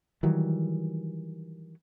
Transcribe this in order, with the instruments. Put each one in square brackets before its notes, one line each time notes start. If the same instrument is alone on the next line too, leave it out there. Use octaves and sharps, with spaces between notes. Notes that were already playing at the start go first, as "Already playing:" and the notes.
[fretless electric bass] D#3 E3 F#3 G3